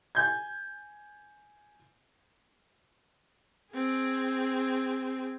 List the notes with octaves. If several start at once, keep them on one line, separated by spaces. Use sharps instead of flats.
G#5 G6 G#6
C4 G#4